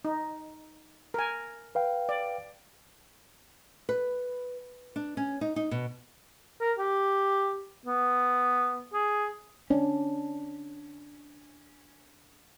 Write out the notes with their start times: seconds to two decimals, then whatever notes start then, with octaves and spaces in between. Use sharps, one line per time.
0.05 D#4
1.14 A#4 G#5
1.75 B4 F5 G5
2.09 D5
3.89 B4
4.96 D4
5.17 C#4
5.41 D#4
5.56 D#4
5.71 B2
6.61 A#4
6.78 G4
7.86 B3
8.93 G#4
9.70 C#4 D4